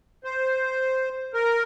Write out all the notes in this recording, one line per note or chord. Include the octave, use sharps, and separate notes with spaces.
C5
A#4